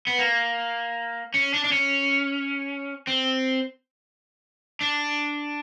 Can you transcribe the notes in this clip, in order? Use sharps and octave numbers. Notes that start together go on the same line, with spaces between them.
B3
A#3
C#4
D4
D4
C#4
C4
D4